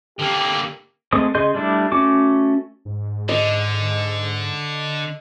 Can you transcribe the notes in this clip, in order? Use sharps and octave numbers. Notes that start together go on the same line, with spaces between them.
D3 A#3 G4
G#3 A3 C4 D#6
C#3 G#4 D#5 C6 G6
G3 A3 D4 E4
A3 C#4 F#4 D6
G#2
D3 D#5